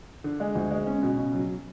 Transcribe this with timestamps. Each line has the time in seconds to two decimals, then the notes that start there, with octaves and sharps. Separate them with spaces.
0.24 D3
0.40 G#3
0.55 D2
0.71 G#3
0.87 C#4
1.03 B2
1.18 C#3
1.33 F#3